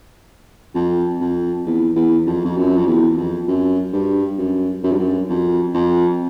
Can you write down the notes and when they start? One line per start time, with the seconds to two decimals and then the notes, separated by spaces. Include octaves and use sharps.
0.75 F2
1.20 F2
1.66 E2
1.96 E2
2.27 F2
2.45 F2
2.57 F#2
2.77 F2
2.87 E2
3.17 F2
3.48 F#2
3.93 G2
4.38 F#2
4.83 F#2
4.92 G2
4.99 F#2
5.29 F2
5.74 F2